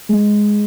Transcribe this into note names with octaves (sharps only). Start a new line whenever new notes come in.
G#3